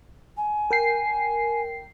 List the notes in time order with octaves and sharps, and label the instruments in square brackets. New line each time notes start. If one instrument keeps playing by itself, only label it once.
[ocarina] G#5
[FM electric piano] A#4 G5 C7